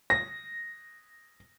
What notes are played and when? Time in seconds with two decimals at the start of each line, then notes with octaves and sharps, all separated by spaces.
0.10 A#6